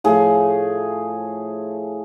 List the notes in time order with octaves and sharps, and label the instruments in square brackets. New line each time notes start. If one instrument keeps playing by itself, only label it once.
[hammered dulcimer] A2 F3 A3 G#4